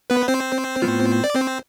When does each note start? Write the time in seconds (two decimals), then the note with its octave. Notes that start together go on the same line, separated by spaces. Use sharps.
0.10 B3 B4
0.28 C4 C5
0.82 A2 G#3 B3 F4
1.24 D5
1.35 C4 C5